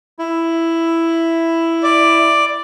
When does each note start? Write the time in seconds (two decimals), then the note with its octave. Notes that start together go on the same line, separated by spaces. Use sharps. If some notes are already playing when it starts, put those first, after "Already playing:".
0.19 E4
1.83 D5